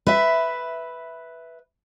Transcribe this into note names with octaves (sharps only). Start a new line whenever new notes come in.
B4 E5